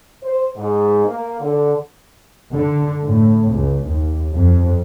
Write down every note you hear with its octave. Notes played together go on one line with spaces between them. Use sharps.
C5
G#2
A#3
D3
D3
A2
C#2
D#2
F2